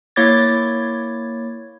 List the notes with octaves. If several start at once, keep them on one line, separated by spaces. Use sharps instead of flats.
A#3 E4 C#5 D6 G#6 A6